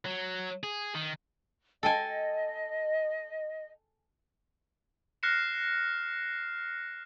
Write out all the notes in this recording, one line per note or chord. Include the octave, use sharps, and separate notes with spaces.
F#3
G#4
D#3
A4 D#5 G5 G#5
F6 F#6 A#6 C7 C#7 E7